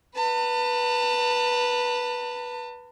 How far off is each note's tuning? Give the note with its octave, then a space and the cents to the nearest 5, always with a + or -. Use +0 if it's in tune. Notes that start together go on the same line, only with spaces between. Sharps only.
B4 -10 A5 +35